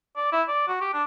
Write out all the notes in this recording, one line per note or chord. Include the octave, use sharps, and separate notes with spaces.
D5
E4
D5
F#4
G4
D4